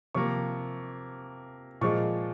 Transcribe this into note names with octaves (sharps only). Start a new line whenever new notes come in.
C3 F3 A#3 C#6
A#2 F3 G#3 C#6